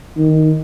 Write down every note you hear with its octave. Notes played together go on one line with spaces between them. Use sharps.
D#3